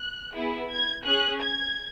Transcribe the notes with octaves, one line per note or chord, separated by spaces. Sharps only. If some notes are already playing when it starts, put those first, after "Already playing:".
Already playing: F#6
B3 E4 G#4
G#6
C#4 G#4 F#6
G#6